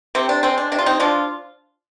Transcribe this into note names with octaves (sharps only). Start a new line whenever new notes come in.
C3 C4
D4
G#3 C4
D4
C3 D4
F4
C4 D#4
F3 D4 F4